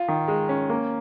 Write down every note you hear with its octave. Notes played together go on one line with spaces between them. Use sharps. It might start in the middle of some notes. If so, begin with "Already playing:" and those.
Already playing: F4
D#3
G#3
C#4
A#3